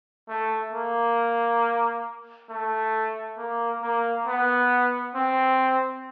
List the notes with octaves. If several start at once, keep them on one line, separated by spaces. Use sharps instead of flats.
A3
A#3
A3
A#3
A#3
B3
C4